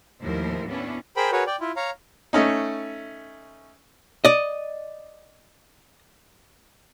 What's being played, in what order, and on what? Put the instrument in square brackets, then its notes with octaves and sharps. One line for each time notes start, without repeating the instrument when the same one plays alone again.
[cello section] D#2 A2 F3 E4 A#4 C5
B3 C#4 D4 E4
[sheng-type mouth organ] G#4 A#4 C5 G5 B5
F#4 G#4 A#4 B4 C#5
D5 G5
E4 F4
C#5 F5 A#5
[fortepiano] A3 C#4 D#4
[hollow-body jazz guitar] D5 D#5